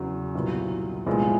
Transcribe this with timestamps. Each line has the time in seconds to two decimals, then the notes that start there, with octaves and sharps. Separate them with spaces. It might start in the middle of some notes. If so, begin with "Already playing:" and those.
Already playing: E2 C#3 F#3
0.35 C2 A#2 F#3 B3
1.06 C2 A#2 F3 G#3 B3